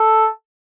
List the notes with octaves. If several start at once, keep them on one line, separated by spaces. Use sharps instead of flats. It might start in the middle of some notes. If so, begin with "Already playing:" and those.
Already playing: A4